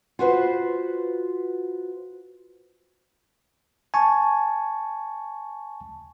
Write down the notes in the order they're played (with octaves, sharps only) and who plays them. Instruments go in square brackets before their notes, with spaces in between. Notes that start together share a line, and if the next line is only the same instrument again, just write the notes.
[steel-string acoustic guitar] F4 F#4 B4 C5
[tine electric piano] G#5 A5 C#6